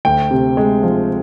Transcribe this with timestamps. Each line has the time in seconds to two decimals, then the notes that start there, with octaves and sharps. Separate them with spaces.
0.05 D2 G5
0.31 C3
0.57 G#3
0.83 F3